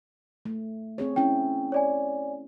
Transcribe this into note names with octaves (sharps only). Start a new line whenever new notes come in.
A3
C4 G#4 C#5
C4 C#4 E4 G5
C#5 D5 G#5